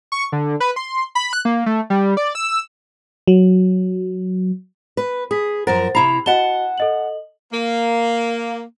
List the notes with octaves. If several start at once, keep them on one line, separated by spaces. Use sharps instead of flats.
C#6
D3
B4
C6
B5
F#6
A#3
A3
G3
D5
E6
F#3
B4
G#4 D#6 B6
F#2 F3 A#4 C5 F#5 A6
C3 E4 A#5 B5 C7 F7
F#4 D#5 F#5 A5 G7
A4 D#5 F#7
A#3